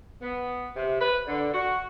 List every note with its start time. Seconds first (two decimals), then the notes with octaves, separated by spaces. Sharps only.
0.22 B3
0.76 C3
0.99 B4
1.27 D3
1.53 F#4